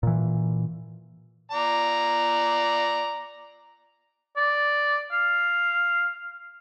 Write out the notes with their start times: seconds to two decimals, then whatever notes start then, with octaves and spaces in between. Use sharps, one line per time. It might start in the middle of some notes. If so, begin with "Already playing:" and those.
0.03 A#2 E3
1.51 D5 A#5
4.37 D5
5.12 F5